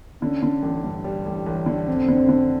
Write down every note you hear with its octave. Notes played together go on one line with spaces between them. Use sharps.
D3 C#4
D3
A1
G2
G3
A1
A1
D3
F1 C4
D3
D3